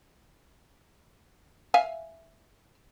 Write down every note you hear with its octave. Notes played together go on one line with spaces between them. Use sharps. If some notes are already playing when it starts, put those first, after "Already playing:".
E5 F5 G#5